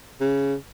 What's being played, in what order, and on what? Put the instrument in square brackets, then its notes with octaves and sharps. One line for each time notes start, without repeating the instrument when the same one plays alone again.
[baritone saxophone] C#3